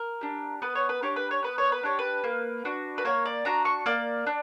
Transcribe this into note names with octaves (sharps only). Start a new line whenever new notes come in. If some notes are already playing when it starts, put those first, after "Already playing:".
Already playing: A#4
D4 G4
B3 B4
C#5
B4
D4 G4 C#5
B4
C#5
B3 B4
C#5
B4
D4 G4 C#5
B4
A#3
D4 F#4
B4
A#3 C#5
D5
D4 F#4 A#5
C#6
A#3 D5
D4